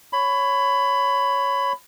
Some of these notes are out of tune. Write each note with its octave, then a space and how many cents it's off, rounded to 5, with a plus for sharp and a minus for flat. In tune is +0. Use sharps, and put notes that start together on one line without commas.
C#5 +0 B5 +20